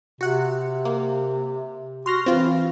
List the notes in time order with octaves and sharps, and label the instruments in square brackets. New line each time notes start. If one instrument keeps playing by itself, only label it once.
[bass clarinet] C3 [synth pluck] F#4 F#5
[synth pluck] A#3
[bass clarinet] F#4 [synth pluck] C6 F6 A#6
[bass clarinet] E3 [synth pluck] C4 F4